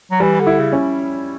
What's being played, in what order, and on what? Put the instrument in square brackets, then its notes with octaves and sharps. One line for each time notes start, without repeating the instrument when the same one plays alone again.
[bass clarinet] F#3
[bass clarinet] E3 [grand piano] G3
[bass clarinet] D3
[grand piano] E4
[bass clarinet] C#3
[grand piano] C#4